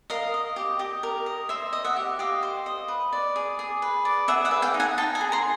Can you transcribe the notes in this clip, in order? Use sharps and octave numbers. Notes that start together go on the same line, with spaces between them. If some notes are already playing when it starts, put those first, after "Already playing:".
A#4 D#5 F5
D#5
G4
G4 D#5
A#4
D#5
C5 E5
D#5
E5 F#5
G4
G4 D#5 F5
C5
D#5
B4
D5
G#4
G#4
B4
D5
G#4 E5 F#5
E5 F#5
B4
F5 G5
D#4
F#5 G#5
D#4 G5 A5
G#5 A#5
G#4
A#5 C6